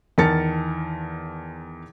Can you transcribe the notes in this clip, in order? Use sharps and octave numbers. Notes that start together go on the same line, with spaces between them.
E2 D#3 A#4 A5 A6 C#7